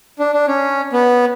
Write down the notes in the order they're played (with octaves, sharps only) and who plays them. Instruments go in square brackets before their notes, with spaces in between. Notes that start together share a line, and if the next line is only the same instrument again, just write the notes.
[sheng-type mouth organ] D4
D4
C#4
B3